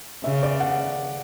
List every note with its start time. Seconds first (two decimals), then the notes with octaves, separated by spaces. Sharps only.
0.24 C#3 E5
0.43 D5
0.60 F#5